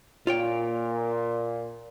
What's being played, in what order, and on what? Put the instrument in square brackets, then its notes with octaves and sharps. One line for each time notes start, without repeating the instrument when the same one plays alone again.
[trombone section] A#2 [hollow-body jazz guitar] F4 C#5 G5